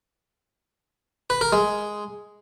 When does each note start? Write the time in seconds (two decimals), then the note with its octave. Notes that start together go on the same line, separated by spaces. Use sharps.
1.30 B4
1.41 A#4
1.53 G#3